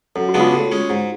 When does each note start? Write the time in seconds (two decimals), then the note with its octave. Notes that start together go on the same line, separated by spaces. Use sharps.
0.16 F#2 A4
0.29 F#4
0.34 C#3 G#3 B3 D4
0.40 F4
0.53 A2 F#4
0.72 G#3 C#4
0.90 G#2